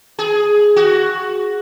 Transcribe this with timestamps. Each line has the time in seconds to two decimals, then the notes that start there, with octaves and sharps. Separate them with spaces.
0.19 G#4
0.76 F#4